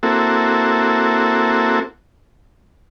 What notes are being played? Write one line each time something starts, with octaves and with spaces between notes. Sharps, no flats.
A#3 C4 E4 F#4 A4